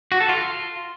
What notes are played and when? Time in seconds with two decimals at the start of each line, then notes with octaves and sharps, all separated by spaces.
0.12 F#4
0.20 A4
0.29 F4